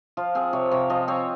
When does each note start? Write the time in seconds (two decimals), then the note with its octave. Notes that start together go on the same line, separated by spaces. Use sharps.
0.17 F3 F4
0.35 C4 G#4
0.53 C3 C#5
0.71 C3 C#5
0.90 F3 D#5
1.08 C4 C#5